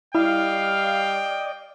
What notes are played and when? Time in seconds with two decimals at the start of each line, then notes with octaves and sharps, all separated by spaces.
0.15 G3 E4 D5 D#5 F5 G5